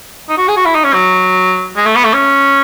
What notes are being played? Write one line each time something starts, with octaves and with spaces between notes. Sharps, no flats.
D#4
F#4
G#4
F#4
E4
D#4
C#4
F#3
G#3
A3
B3
A3
C#4